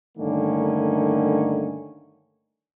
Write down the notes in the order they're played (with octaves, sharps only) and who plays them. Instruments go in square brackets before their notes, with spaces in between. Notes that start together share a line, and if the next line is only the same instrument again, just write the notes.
[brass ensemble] G2 D3 D#3 A3 A#3 C#4